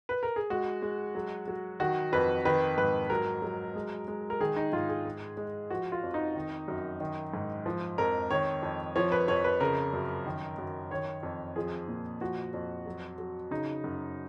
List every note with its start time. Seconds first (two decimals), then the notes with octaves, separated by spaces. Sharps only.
0.09 B4
0.23 A#4
0.36 G#4
0.50 G#3 F#4
0.82 G#3
1.15 F#3
1.48 F#3
1.80 D#3 F#4
2.12 F2 B4
2.45 D#3 B4
2.78 G#2 B4
3.10 F#3 A#4
3.42 F#3
3.75 G#3
4.08 G#3
4.30 A#4
4.40 D#3 G#4
4.56 D#4
4.73 G#2 F4
4.89 G#4
5.06 G#3
5.37 G#3
5.70 F3 F#4
5.92 F4
6.03 F2
6.14 D#4
6.35 D#3
6.68 F#2
7.00 D#3
7.34 G#2
7.66 F3
7.98 F2 A#4
8.30 D#3 C#5
8.63 F2
8.96 F3 C#5
9.12 B4
9.28 F2 C#5
9.44 B4
9.60 C#3 A#4
9.93 F#2
10.26 D#3
10.58 F#2
10.91 D#3 C#5
11.23 F2
11.56 F3 G#4
11.88 A#2
12.21 F3 F#4
12.53 F2
12.86 F#3
13.18 F#3
13.51 C#3 D#4
13.84 F#2